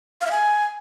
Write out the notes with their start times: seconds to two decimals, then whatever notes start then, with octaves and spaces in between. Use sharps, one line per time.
0.21 F5
0.26 E5
0.31 G#5